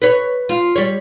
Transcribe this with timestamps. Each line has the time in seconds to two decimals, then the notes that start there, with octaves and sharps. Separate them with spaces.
0.02 B4 C#5
0.49 F4
0.76 G3 C#5